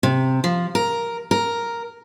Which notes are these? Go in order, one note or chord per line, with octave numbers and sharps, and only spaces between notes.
C3
F3
A#4
A#4